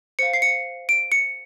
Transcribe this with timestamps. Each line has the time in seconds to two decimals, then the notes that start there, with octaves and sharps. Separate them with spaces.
0.19 C5 F5 C#7
0.34 C7
0.42 C#7
0.89 D7
1.12 C#7